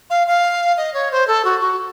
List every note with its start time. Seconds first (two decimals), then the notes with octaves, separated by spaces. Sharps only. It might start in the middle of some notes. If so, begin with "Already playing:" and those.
0.10 F5
0.27 F5
0.77 D#5
0.94 C#5
1.11 C5
1.28 A4
1.45 F#4
1.61 F#4